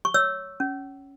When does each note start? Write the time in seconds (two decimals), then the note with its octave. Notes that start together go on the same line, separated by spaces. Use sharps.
0.05 C#6
0.14 C#5 E6
0.60 C#4